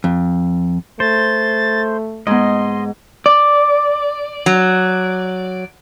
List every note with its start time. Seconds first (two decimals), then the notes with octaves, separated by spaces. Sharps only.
0.04 F2
1.00 A3 C5 A6
2.27 G#2 B3 D#5 C6
3.26 D5
4.46 F#3